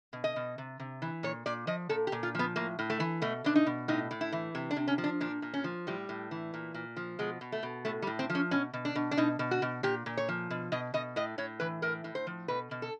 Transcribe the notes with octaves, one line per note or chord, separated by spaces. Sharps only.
B2
D#5
B2
C3
C3
E3
A#2 C#5
A#2 D5
F3 D#5
A#2 A4
G4
A#2
F4
F3 B3
A2 A#3
A2
A3
E3
B2 A3
B2 D4
D#4
B2
A2 D#4
A2
E4
E3
C3
D4
C3
C#4
F3
D4
A#2 D4
A#2
C#4
F3
A2 G3
A2
E3
A#2
A#2
F3
B2 G#3
B2
A3
B2
A2 A3
G3
A2
C4
F3
C#4
B2 C#4
B2
D4
B2
D4
B2 D#4
B2
F#4
B2
A#2 G4
A#2
C#5
F3
B2
B2 D#5
B2 D#5
A2 D#5
A2 C#5
E3 B4
A2 A#4
A2
C5
F3
B2 B4
B2
A4